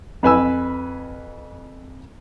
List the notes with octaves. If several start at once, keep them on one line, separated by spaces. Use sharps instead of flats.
F2 B4 G#5 E6